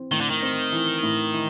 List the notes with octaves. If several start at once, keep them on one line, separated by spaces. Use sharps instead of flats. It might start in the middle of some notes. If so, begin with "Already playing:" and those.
Already playing: E3 C4
A2 D#3
D3
D#3
C4
E3
A2
E3